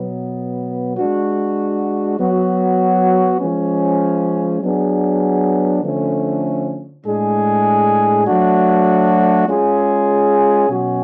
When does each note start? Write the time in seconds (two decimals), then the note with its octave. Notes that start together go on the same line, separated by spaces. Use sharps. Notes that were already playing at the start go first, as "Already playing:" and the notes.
Already playing: B2 F#3 B3
0.97 G#3 D4 F#4
2.18 F#3 B3 F#4
3.41 F3 G#3 C#4
4.62 F#3 B3 D4 G#4
5.83 D3 F3 A3 C#4
7.06 A2 G#3 D4 G#4
8.26 F#3 A3 D4 F#4
9.48 G#3 C#4 F4 G#4
10.69 B2 F#3 C#4 F#4